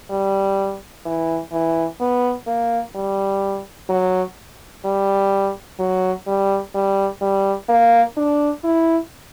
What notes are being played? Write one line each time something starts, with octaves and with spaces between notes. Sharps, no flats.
G3
E3
E3
B3
A#3
G3
F#3
G3
F#3
G3
G3
G3
A#3
D4
E4